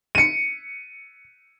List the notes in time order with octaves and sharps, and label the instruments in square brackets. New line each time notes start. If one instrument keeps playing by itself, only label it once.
[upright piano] C#7 D#7